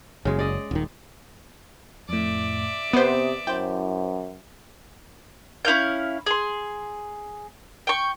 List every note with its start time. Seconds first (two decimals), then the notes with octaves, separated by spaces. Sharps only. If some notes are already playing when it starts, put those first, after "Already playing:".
0.25 F#1 C#3 G#3
0.39 D5 D#5
0.71 D#1 D#3
2.09 F2 A2 D5 E5
2.93 C3 B3 C5 D#6
3.47 F#2 E4 C5 G5
5.65 C#4 E4 F5 G6
6.26 G#4 C6
7.87 G5 C#6